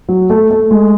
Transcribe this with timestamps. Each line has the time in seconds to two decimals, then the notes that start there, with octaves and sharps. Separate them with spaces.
0.09 F#3
0.30 A3
0.50 A3
0.71 G#3